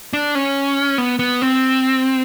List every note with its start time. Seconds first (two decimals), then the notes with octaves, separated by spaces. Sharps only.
0.13 D4
0.35 C#4
0.98 B3
1.19 B3
1.42 C4